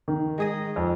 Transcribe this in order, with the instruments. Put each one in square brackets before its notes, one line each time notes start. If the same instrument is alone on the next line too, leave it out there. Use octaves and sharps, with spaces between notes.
[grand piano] D#3
[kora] G#3 G#4 D#5
[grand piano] F2